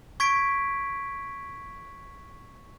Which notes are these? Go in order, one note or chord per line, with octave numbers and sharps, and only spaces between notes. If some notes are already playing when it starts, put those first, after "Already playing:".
C#6 G#6 B6 D7